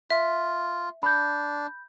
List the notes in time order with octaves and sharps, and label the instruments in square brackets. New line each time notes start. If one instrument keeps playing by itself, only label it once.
[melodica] F4 [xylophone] E5
[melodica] D4 [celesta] B5 G6